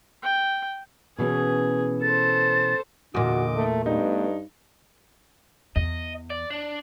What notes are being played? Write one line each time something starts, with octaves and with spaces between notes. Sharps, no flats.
G5
B2 E3 C#4 G#4
A4 C5 A6
E2 A#2 D3 F#4 D#5 D6
A3
G2 A3 B3 D#4
E2 D#5
D5
D4